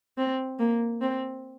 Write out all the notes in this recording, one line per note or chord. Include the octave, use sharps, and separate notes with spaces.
C4
A#3
C4